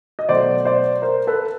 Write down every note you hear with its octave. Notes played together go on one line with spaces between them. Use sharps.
D#5
B2 F#3 A3 C5 D5
C5 D5
A#4 C5
A4 B4